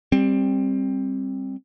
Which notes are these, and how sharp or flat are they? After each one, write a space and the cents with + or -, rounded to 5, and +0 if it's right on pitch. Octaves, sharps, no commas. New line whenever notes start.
G3 +15 C4 +15